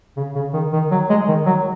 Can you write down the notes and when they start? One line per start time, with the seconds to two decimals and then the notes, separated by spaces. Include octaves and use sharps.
0.17 C#3
0.35 C#3
0.53 D#3
0.73 D#3
0.91 F#3
1.10 G#3
1.28 D#3
1.46 F#3